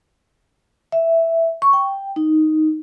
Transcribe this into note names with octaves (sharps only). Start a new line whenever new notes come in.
E5
C#6
G5
D#4